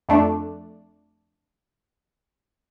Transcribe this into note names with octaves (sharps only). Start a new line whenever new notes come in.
F2 A3 D4